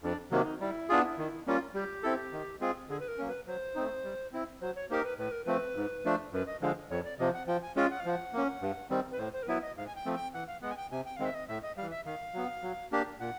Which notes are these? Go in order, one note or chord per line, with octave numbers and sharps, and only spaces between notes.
F2 D4
C3 D#3 F#3 A#3
D#4
G3 E4
B3 D4 F4 G#4
D#3
G3 A#3 C#4 F4
G3 G4
C4 E4 A4
D#3
G#3 C4 F4 G#4
D3 G#4
B4
A#4
F#3 A#3 C#4
B4
F#3 C5
A3 C4 D#4
G3
C4 E4
F#3 C5
C#5
A#3 D#4 G4 A#4 C5
B4
A2 B4
A#4
F3 A3 C4 B4
G#2
F3 A3 D4
F#2 B4
D#5
D3 F3 G#3 F5
F2 C#5
D5
C3 F3 D#5
F#5
F3 G5
G#5
G#3 C#4 F4 G5
F#5
F5
F3 F#5
A#3 C#4
G2
D#3 G3 C4
B4
A2 C5
C5
A#4
F#3 B3 E4 B4
D#5
G#2 F5
G#5
G5
F3 A3 C4
G5
E3 F#5
F5
G#3 B3 F#5
G#5
G5
C3 G#5
G5
D#3 G#3 C4 F5
E5
D#5
A2 E5
D#5
E3 G3 F5
E5
D#3 F5
F#3 B3
F#3
A#3 D4 G4
A#2 F#5